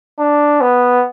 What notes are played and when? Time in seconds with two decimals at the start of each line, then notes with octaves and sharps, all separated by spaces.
0.19 D4
0.61 B3